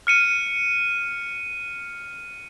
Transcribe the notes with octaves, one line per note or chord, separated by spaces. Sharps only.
F6 C#7 D#7